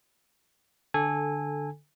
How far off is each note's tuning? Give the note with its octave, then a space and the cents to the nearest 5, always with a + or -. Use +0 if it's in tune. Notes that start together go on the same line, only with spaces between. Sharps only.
D3 +0 A4 -10 G#5 -20